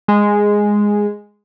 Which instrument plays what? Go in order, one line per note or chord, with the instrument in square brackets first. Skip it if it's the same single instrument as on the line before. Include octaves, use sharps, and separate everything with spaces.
[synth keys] G#3